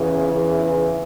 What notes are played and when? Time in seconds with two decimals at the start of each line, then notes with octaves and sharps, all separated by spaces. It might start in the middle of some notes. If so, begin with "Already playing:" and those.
Already playing: E2 C#3 E3
0.30 E2 C#3 E3
0.60 E4